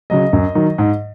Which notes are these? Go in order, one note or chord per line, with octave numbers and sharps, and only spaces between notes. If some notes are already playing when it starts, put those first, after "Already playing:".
C#3 F#3 D#5
F#2
D#3 F#3
G#2